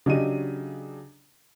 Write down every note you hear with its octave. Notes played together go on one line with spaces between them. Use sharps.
C#3 F#3 D4 G4 D#5 D#7